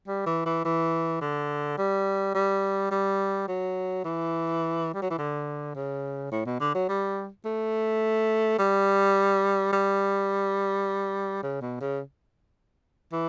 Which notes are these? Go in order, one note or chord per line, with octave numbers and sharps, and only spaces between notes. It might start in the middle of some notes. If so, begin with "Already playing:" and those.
G3
E3
E3
E3
D3
G3
G3
G3
F#3
E3
G3
F#3
E3
D3
C#3
A2
B2
D3
F#3
G3
A3
G3
G3
C#3
B2
C#3
E3